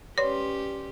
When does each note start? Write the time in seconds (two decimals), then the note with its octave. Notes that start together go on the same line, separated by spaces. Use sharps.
0.18 C#4 G4 B4 C#5 D5 C6